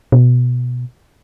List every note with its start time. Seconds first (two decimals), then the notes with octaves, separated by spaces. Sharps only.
0.12 B2